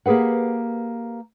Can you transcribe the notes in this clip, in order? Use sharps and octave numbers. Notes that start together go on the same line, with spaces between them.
A#3 G4 G#4 B4 F#5